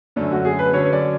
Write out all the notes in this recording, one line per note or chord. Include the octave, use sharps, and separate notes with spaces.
F#2 D3 A3 C#4 D4
F#4
G#4
B4
D3 F#3 C#4 C#5
D5